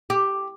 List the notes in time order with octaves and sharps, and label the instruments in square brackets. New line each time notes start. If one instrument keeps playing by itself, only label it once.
[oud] G4